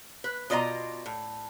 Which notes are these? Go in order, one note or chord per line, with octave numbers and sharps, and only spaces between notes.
B4
B2 F4 D5 D#5 F5 A#5
A2